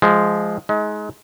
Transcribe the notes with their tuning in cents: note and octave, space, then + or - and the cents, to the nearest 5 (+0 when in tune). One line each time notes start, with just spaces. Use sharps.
F3 -15 G#3 +0
G#3 +25 D#4 +35